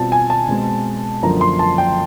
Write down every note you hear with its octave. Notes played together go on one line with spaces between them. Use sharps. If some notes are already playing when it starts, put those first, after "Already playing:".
Already playing: B2 G3 C4 F4 A5
G#5
A5
B2 G#3 C4
F#2 D3 F3 A#3 A#5
C6
A5
G5